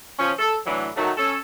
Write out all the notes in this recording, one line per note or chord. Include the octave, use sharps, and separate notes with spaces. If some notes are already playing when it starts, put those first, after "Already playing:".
F3 C#4
A4
A2 D3 E3 F#3 D4
D#3 F#3 A3 F#4
C#4 A4